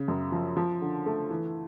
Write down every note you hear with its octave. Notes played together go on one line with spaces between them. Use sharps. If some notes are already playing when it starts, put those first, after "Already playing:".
Already playing: C#3
F#2
F3
F3
D3
A3
E3